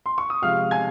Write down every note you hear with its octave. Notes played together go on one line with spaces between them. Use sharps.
C6
C#6
D#6
C3 F3 G#3 F5 F6
G#5 G#6